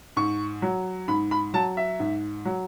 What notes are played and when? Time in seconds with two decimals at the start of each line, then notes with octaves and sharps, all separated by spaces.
0.16 G#2 C#6
0.62 F#3
1.08 G#2 B5
1.31 B5
1.54 F#3 A5
1.77 E5
2.00 G#2
2.45 F#3